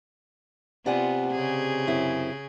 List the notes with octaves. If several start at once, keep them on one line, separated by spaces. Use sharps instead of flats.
C3 B3 F4 D5 F#5 G#5
C#3 G#4
F#2 C4 E4